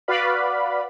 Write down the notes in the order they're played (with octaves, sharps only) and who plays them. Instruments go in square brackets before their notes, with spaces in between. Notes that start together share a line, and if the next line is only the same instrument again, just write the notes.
[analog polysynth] F#4 B4 D5 F5 B5